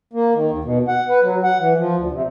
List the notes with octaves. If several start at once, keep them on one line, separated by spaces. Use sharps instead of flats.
A#3
D#3
D#2
B2
F#5
B4
F#3
F#5
E3
F3
D2
C3